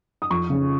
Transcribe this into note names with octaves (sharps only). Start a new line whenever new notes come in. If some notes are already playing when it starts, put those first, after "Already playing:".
D#6
F2 C#6
C#3